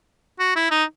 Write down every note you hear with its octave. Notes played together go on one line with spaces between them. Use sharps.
F#4
E4
D#4